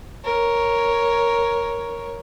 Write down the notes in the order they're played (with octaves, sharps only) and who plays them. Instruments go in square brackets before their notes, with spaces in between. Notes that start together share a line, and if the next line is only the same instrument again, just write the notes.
[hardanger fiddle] A#4 C#5